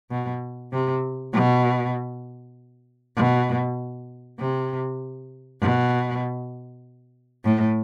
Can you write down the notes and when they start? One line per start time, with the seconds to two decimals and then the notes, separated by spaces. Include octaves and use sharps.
0.11 B2
0.72 C3
1.33 B2
3.16 B2
4.39 C3
5.60 B2
7.44 A2